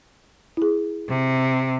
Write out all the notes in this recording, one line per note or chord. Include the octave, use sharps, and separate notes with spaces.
E4 G#4
C3